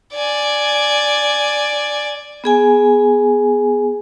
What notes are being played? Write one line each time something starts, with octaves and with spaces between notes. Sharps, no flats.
D5 G#5
B3 G#4 G#5